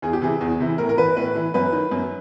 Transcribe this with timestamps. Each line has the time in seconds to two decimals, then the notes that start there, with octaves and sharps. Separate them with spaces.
0.02 E2 G#4
0.13 G4
0.22 C3 E3 G#4
0.41 E2
0.60 C3 E3
0.78 A2 A#4
0.89 A#4
0.97 E3 B4
1.17 A2 B4
1.35 E3
1.54 F#2 B4
1.73 D#3
1.91 F#2